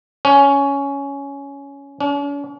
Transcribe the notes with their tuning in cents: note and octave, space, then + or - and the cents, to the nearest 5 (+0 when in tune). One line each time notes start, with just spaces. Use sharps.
C#4 +10
C#4 +45